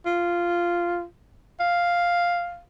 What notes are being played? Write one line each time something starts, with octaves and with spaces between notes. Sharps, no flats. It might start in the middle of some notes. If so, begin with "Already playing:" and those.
F4
F5